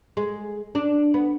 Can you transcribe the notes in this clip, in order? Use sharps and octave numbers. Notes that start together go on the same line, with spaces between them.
G#3
D4
B3